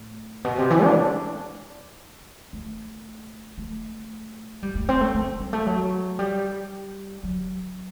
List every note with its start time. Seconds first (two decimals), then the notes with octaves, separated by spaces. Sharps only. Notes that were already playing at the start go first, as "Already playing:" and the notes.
Already playing: A2
0.44 B2
0.58 C3
0.70 E3
0.84 D4
2.53 A3
3.58 A3
4.63 G3
4.75 A3
4.89 C4
5.01 A3
5.14 A3
5.40 G3
5.53 A3
5.67 F#3
6.19 G3
7.23 F#3